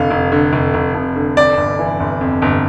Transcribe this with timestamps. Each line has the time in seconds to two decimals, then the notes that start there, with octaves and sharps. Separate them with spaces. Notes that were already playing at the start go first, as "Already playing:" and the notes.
Already playing: F1 D3 F5
0.11 F1
0.32 D3
0.53 F1
0.74 F1
0.94 F1
1.16 D3
1.37 F2 D5
1.57 G1
1.79 E3
2.00 G1
2.21 F2
2.42 G1